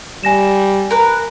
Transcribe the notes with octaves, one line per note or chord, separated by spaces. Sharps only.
G3 G#5 A#6 E7
A#4 B4